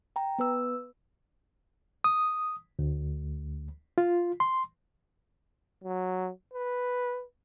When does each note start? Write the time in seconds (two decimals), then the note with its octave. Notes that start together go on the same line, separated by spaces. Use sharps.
0.16 G5 A#5
0.38 B3 B4 E6
2.04 D#6
2.79 D2
3.98 F4
4.40 C6
5.84 F#3
6.53 B4